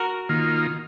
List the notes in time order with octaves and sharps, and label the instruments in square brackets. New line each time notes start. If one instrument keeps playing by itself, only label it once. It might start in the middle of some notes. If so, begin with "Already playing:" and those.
Already playing: [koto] F#4 A#4
[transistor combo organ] D#3 A#3 F4